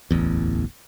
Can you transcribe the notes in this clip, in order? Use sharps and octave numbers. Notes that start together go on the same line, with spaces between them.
D1 A1 E2